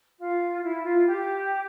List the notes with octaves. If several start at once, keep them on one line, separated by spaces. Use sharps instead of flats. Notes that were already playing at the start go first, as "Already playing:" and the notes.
F4
E4
F4
G4